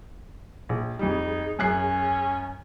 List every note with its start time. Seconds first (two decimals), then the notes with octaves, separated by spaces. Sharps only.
0.69 A#1 G#4
0.99 F2 G3 D#4
1.59 F#2 C#4 F#6 C7